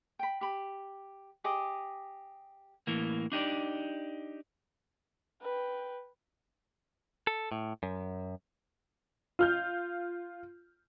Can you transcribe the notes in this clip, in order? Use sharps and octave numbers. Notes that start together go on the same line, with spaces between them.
G5 B5
G4 B5
G4 G#4 D#5 D6
A2 E3 A#3
D4 D#4 G4 D5
B4 G5
A4
A2
F#2
F4 F6 G6